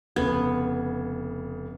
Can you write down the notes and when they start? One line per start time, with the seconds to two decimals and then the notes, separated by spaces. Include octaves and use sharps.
0.16 F1 C#3 B3 G#6